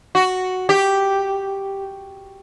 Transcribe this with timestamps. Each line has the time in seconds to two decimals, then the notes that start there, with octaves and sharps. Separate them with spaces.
0.15 F#4
0.69 G4